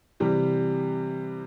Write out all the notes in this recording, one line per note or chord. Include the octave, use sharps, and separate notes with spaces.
C3 E3 G3 G4